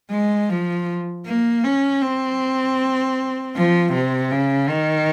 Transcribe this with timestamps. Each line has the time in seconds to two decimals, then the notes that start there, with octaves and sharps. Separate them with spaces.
0.11 G#3
0.49 F3
1.26 A#3
1.64 C#4
2.02 C4
3.55 F3
3.93 C3
4.32 C#3
4.70 D#3